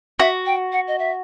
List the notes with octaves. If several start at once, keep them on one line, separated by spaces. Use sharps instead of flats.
F#4 E5
G5
F#5
D#5
E5